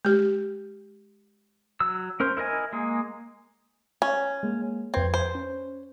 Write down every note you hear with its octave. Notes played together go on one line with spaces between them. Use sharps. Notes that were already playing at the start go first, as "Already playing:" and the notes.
G#3 G4
F#3 E6
C#4 A#4 C5
E4 A#4 D#5 G#5
G#3 A#3 G#4
C#4
G#3 A#3
F2 C4 B4 G#6
C5
C#4